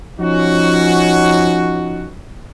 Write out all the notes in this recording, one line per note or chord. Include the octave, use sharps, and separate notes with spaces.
F3 C#4 D#4 F#4